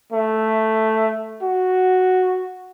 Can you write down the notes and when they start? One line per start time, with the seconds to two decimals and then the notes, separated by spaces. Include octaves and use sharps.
0.12 A3
1.43 F#4